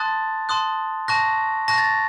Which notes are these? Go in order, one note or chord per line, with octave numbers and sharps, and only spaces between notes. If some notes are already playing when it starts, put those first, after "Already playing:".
Already playing: A5 C6 D#6 F#6 A6
A5 C6 D#6 F#6
A5 C#6 F#6 A#6
A5 C#6 F#6 A#6
A6